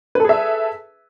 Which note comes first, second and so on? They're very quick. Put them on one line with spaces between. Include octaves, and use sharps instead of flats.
B4 A4 G#4 E5